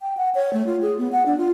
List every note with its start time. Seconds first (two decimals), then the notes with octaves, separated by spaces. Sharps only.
0.02 G5
0.17 F#5
0.35 C#5
0.53 A3
0.66 F4
0.82 G#4
0.98 B3
1.12 F#5
1.26 D4
1.38 F4